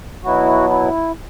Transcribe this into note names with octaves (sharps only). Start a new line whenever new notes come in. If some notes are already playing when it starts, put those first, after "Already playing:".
B2 F#3 B3 E4 F#4
E4